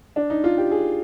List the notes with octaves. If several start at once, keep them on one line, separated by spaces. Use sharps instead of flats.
D4
D#4
F4
G4
G#4